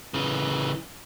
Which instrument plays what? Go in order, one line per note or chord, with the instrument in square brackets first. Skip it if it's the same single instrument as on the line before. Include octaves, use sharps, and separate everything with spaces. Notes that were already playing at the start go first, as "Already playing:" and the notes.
[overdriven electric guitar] C#3 E3